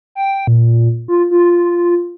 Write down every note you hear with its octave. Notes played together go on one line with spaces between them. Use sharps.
G5
A#2
F4
F4